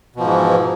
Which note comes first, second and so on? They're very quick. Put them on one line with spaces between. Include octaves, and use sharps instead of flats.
B2 F3 G#2 E3